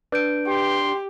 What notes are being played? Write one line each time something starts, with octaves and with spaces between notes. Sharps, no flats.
D4 B4 G6 D7
G4 C6